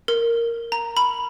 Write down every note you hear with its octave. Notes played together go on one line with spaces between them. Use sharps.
A#4
A#5
B5